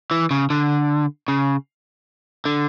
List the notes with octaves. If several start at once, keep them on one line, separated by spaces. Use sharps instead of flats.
E3
C#3
D3
C#3
D3